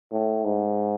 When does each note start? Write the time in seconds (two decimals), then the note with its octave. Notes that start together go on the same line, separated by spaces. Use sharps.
0.12 A2
0.44 G#2